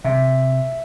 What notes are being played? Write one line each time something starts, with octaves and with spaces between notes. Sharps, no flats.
C3 E5